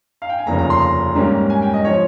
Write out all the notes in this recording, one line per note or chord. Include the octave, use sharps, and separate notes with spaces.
F5
G5
G#5
F1 D#2 C#3 F3 A#5
A#5
C6
A#5
G#2 G3 A#3 C#4
G#5
G5
D#5
F3 C4 C#5